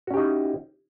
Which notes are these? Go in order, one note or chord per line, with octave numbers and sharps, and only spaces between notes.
C#4 D#4 E4 F#4 G4